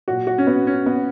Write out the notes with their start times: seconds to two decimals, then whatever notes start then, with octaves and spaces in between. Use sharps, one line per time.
0.08 A#2 F#3 F#4
0.27 F#4
0.38 C#4
0.47 B3
0.67 C#4
0.86 B3